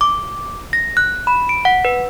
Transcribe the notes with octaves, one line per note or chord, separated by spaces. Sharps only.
D6
A#6
F#6
B5
D7
F#5
B4